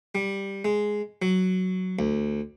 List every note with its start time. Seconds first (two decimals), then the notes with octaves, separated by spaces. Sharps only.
0.15 G3
0.65 G#3
1.22 F#3
1.99 D2